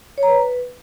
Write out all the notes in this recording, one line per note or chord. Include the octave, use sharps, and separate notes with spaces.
C#5
A#5
B4